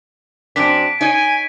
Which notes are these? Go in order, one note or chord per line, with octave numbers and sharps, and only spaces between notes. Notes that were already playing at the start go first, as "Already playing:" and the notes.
F#2 C4 D4 B6 D7
D#4 C#5 D#5 G#5